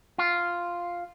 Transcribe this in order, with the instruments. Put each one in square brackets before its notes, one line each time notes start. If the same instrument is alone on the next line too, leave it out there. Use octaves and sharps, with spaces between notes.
[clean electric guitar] F4